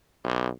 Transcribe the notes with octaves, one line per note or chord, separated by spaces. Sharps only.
B1